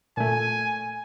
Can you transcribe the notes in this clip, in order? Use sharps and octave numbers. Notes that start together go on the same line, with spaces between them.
A#2 A3 G#5